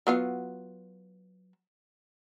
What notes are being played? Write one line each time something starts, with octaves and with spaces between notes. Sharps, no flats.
F#3 B3 F4